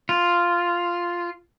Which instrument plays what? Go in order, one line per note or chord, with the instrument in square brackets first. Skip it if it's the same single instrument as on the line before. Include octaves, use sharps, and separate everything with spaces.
[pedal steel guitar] F4